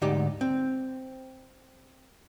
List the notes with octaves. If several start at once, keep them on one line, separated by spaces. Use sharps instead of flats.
D2 G#2 D#4 G4 D5
C4